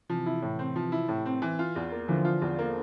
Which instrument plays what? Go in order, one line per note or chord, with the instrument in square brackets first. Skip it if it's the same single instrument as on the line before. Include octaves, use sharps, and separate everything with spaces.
[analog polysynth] C3 E3 [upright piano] F3
[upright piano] E4
A2
C4
F3
E4
A2
C4
E3
F4
E2
A#3
[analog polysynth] D3 F3 [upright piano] E3
[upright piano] F4
E2
A#3